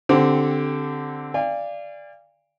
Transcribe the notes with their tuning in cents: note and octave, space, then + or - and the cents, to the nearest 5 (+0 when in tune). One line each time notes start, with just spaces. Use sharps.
D3 +0 C4 +0 G4 -10
D5 +0 F5 -25 G#5 -40